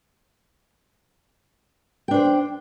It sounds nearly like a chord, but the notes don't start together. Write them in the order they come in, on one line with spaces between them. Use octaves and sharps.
G5 D4 C5